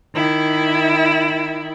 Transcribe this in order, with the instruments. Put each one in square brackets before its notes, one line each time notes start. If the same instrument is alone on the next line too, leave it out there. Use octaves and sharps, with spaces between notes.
[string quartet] D#3 E4